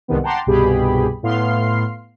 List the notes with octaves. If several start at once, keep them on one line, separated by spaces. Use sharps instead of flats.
C2 G#2 C3 D#3 B3
F#5 G5 A5 A#5 C6 D6
C2 G2 B2 G4 G#4 B5
A2 B3 F5 C6 F6 C7